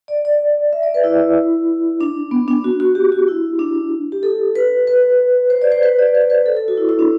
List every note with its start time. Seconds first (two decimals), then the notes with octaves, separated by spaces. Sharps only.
0.08 D5
0.25 D5
0.73 E5
0.83 D5
0.94 B4
1.04 E4
2.01 D4
2.31 B3
2.48 D4
2.64 F#4
2.80 F#4
2.95 G4
3.12 F#4
3.28 E4
3.59 D4
4.12 G4
4.23 A4
4.56 B4
4.87 B4
5.50 C5
5.62 D5
5.72 C5
5.83 B4
5.99 D5
6.15 B4
6.22 C5
6.30 B4
6.46 A4
6.57 A4
6.68 F#4
6.78 E4
6.89 E4
6.99 D4